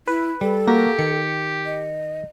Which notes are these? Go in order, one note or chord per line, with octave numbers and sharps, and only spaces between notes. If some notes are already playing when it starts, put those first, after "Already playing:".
E4 B4
G3 A4
A#3 F#4 G4 A#6
D#3 C#7
D#5